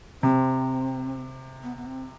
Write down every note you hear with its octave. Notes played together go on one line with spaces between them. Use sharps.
C3 C4
B3
B3
C4